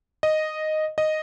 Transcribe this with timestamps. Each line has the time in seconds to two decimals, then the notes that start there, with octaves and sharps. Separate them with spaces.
0.23 D#5
0.98 D#5